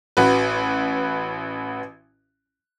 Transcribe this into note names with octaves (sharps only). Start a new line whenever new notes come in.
A1 F#4 B4